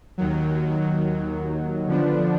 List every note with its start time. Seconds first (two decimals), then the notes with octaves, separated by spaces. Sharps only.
0.18 D#2 D#3 F#3
1.87 D3 F3 B3 D4